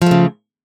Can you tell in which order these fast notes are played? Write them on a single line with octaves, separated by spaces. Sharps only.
F3 A3 C#3